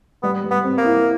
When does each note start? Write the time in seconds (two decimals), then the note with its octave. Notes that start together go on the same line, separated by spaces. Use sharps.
0.23 G3 B3
0.44 G3
0.51 B3
0.64 C4
0.78 A#3
0.84 E4